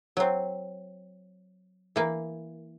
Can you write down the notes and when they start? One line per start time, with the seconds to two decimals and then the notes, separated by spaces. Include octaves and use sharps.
0.17 F#3 C4
1.96 E3 A#3